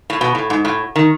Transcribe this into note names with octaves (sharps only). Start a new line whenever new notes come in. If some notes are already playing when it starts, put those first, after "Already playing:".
A2
B2
A2
G#2
A2
D#3